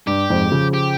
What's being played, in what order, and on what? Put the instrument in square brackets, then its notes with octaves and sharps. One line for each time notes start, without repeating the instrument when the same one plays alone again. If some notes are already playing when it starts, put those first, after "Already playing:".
[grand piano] G2 [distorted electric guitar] G4
[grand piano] F2 G#2
C#3 F3
[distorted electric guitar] G4